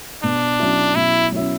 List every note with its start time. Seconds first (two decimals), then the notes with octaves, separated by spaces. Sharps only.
0.23 B2 D4
0.60 F#3 C#4 E4
0.96 B2 E4
1.32 F#3 C#4 E4